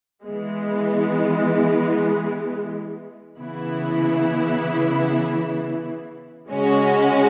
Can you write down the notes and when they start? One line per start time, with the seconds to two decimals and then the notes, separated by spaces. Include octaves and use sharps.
0.24 E3 G#3 B3
3.37 C#3 E3 B3 E4
6.50 C#3 G#3 C#4 F#4